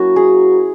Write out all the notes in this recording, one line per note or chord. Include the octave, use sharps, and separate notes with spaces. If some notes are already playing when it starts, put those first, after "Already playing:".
Already playing: F#3 A#3 C#4 E4 F#4
G#4